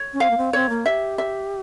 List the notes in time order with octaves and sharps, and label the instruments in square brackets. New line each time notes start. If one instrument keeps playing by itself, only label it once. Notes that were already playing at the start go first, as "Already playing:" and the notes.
Already playing: [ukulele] C#5
[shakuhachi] C#4
[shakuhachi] C4 [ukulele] F5
[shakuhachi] A#3
C4
[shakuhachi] C4 [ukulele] C#5
[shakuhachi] A#3
[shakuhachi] G4 [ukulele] E5
[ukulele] E5